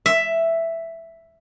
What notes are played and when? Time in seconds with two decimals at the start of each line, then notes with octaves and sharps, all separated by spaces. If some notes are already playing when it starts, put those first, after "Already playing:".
0.06 E5